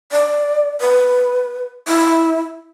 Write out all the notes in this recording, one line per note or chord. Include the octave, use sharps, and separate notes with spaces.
D5
B4
E4